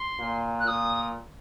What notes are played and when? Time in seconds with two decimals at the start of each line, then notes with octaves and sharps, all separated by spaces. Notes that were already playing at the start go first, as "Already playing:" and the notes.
Already playing: C6
0.19 A#2
0.60 F#6
0.67 A#2 D#6